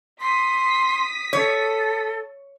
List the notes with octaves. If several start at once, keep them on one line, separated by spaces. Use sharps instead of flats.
C6 D#6 B6
A4 C#5